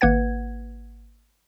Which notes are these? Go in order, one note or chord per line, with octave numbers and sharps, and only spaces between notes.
G#1 A#3 B4 F#5 G#6